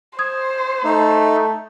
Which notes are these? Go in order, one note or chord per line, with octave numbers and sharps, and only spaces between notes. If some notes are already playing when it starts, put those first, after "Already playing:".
C5 D#6 G#6
A3 D#4